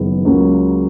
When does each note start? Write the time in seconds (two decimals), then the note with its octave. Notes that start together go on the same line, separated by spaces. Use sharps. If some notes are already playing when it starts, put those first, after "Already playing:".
Already playing: F#1 F#2 D#3 G#3 B3
0.25 C#2 C#3 F#3 A#3 C#4